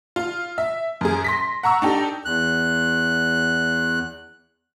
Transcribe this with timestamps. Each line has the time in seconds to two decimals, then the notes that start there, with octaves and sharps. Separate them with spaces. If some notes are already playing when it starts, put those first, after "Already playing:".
0.16 F4
0.58 E5
1.01 F#2 G#4
1.24 C6 A#6 B6
1.63 F#5 A#5 C#6 E6
1.82 D4 D#4 G4 A4
2.25 E2 F#6